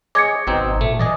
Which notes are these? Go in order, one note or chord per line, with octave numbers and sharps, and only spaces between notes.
G#4 C#5 D#5 D6 G#6 C#7
G#1 B2 C4 D#4
A#2 A3
E3 D5 D#5 G#5